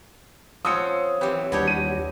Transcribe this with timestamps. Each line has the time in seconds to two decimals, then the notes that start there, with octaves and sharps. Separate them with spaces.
0.65 F3 C4 C#4 F4 F#5 D#6 E6 C#7
1.21 E3 F#3 C4 G4 B4
1.52 D#2 G3 B3 D4 E4 F#4 G4 C#5
1.67 D#7